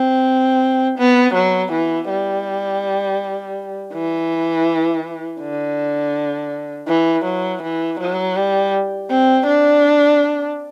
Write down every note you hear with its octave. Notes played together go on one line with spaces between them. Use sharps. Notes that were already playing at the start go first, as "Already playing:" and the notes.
Already playing: C4
B3
F#3
E3
G3
E3
D3
E3
F#3
E3
F#3
G3
C4
D4